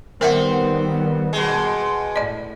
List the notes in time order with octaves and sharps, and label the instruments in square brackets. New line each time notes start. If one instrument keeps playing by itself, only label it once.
[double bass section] D#3 G3 B3 [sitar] C4 [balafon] A#4 E5 F#5
[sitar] B2 G#3
[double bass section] A2 [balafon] D5 D#5